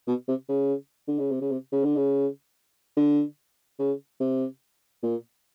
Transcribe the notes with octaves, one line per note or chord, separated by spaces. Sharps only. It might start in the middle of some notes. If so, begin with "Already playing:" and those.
B2
C3
C#3
D3
C#3
C3
C#3
C3
C#3
D3
C#3
D3
C#3
C3
A#2